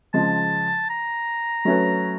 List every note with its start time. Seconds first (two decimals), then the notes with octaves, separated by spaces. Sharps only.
0.13 C#3 F3 G#3 A5
0.90 A#5
1.65 F#3 A3 C#4 F#4 B4